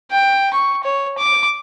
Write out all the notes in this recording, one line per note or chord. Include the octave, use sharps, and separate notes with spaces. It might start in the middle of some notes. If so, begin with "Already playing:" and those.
G5
C#6
C#5
D6